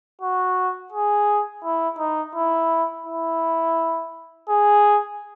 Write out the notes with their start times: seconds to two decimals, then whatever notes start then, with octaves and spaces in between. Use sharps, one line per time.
0.21 F#4
0.92 G#4
1.64 E4
1.99 D#4
2.35 E4
3.07 E4
4.49 G#4